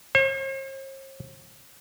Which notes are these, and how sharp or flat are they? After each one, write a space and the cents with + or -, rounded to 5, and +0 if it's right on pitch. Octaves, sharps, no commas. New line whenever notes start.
C5 +45